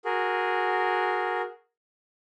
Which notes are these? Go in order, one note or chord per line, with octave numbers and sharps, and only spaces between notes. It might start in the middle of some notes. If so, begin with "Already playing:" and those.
F#4 G#4 A#4